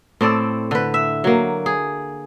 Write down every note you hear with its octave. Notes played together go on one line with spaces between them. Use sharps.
A2 C4 A4 D5
D3 B4
E5
F#3 A#3
G#4